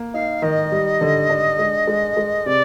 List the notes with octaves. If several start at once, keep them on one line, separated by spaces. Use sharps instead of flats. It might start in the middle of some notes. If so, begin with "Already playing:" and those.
Already playing: A#3
D#4 F5
D#3 D#5
G3
D3
D4
G#3
G#3
G#3
C3 D5